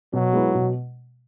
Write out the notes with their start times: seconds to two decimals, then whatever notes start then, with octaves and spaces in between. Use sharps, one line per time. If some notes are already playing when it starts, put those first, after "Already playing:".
0.13 B2 F#3
0.33 G#3 B3 E4
0.55 B2